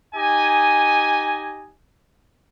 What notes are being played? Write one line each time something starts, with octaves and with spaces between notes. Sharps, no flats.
D#4 G4 D#5 G#5